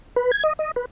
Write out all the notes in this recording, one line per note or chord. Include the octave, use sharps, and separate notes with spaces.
B4
G#6
D#5
D#5
B4